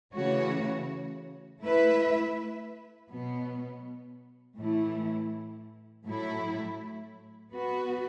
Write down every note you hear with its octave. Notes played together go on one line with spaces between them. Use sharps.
C#3 E3 A3 F#4 C#5
A3 E4 B4 E5
B2 F#3 B3
A2 E3 A3 E4
A2 F#3 A3 E4
B3 F#4 B4